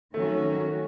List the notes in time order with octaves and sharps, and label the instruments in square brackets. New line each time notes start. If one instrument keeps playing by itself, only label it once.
[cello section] D#3 F#3 C#4 F#4 [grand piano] A3